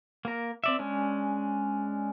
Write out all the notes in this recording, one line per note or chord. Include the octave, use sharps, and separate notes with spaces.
A#3 A#4
C4 D5 E5
G#3 C#4 D4